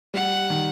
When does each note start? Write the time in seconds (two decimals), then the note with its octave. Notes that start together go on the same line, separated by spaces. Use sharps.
0.14 G3 F#5
0.50 D#3